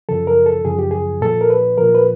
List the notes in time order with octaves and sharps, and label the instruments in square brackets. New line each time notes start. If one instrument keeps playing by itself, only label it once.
[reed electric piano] F#2 C#3 F3 A4
A#4
A4
F#2 C#3 F3 G#4
G4
G#4
A#2 F3 A4
A#4
B4
A#2 F3 A#4
B4